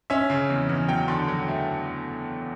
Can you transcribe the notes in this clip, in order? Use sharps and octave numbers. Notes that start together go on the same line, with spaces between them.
C#4 E5
C#3
E2
E2
F#3 G5
D3
F#3
A3